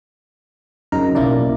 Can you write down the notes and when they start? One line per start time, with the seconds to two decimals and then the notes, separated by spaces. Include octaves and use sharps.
0.92 F#2 C#3 D#4 A#4 A#5
1.15 B1 F#2 A#3 E4 D5